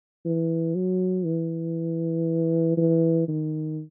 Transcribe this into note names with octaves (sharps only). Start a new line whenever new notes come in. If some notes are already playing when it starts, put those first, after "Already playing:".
E3
F#3
E3
E3
D#3